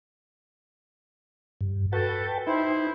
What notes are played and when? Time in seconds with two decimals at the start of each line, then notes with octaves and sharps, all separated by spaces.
1.61 G2
1.93 F#4 A4 B4 G5 A5
2.47 D#4 E4 C5